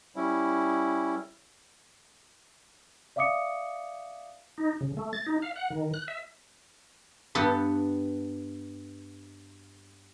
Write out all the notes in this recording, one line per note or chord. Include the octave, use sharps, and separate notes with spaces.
G3 C#4 E4
D5 E5 F5 D6 D#6 C#7
D#4
C#3
A3
A6
D#4
F5
F#5
D#3
F#6
E5
G2 B3 G4 A4 B4